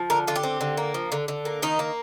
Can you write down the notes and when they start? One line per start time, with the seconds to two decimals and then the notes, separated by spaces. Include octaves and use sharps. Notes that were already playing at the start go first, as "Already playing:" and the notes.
Already playing: F3
0.10 D3 A#4
0.27 D3 F4
0.36 G4
0.43 C4
0.61 D3
0.77 A#3
0.94 F3
1.12 D3
1.28 D3
1.45 A#3
1.62 D#3 D#4
1.79 A#3